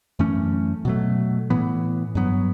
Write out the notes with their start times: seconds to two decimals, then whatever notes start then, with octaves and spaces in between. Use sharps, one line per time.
0.19 F#2 E3 A3 C#4
0.85 B2 F#3 A3
1.50 A2 E3 B3
2.15 G2 F#3 B3